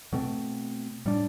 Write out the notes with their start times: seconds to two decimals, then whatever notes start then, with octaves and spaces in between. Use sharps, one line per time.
0.13 B2 A3 C4
1.06 A2 G3 D4